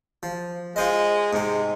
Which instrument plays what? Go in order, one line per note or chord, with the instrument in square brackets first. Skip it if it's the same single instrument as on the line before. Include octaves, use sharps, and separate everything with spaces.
[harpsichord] F3
[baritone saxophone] G#3 [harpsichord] F4 C5 D#5
[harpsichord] G#2 G#3 [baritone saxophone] C3